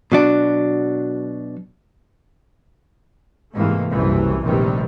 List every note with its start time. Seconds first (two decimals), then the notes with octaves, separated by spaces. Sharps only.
0.12 B2 F#3 D4
3.53 G#2 C3 E3 A3 A#3
3.91 F#1 C2 F#2 C3 E3
4.43 F1 A#1 C3 D#3 E3 G3